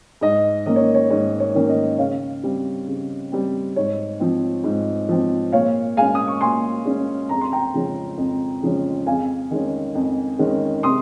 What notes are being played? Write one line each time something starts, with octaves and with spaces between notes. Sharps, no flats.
G#2 D#5
D#3 A#3 C#4 D#5
C#5
C#5
G#2 C#5
C#5
D#3 A#3 C#4
D#5
C#3 C#5 F5
G3 C4
C#3
G3 C4
G#2 C#5
F3 C4
G#2
F3 C4
A#2 C#5 F5
G#3 C#4 F5 G#5
D#6
C#6
A#2 G#5 C6
G#3 C#4
F2 A#5
C6
G5 A#5
C#3 F3 G#3 C#4
F2
C#3 F3 G#3 C#4
F2 F5 G#5
D#3 G#3 C#4
F2
D#3 G#3 C#4
C3 C6 D#6